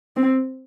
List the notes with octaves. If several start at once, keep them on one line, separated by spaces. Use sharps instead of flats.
C4